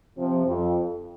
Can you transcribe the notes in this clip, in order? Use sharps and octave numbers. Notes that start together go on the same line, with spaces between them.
C3 F3
F2